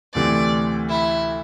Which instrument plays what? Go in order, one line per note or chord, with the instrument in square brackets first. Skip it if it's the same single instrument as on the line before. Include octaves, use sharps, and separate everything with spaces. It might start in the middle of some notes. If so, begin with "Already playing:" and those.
[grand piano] D2 C3 E3 A3 C4 [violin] D5
[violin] E4